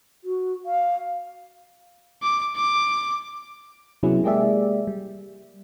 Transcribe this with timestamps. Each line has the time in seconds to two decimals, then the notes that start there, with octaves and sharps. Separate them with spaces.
0.24 F#4
0.66 F5
2.23 D6
2.56 D6
4.03 C3 F#3 B3 C#4 E4 G#4
4.23 G#3 A#3 G4 G#4 D5 E5
4.87 G3